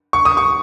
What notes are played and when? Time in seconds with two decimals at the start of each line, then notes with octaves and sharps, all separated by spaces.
0.13 C#6
0.25 D#6
0.37 C#6